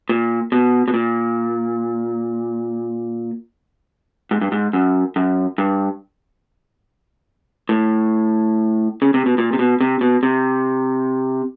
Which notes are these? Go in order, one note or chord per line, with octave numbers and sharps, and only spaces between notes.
A#2
B2
B2
A#2
G#2
G2
G#2
F#2
F#2
G2
A2
C#3
C3
B2
A#2
C3
B2
C3
B2
C3